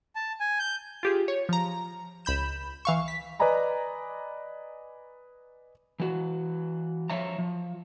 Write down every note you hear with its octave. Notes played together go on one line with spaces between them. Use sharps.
A5
G#5
G6
F4 G4 G#4
C#5
F3 A#5
C#2 B5 G6 E7
E3 F5 C#6
B6
B4 D5 D#5 G#5 A#5 B5
E3 F#4
F3 C#5 E5 A#5
F3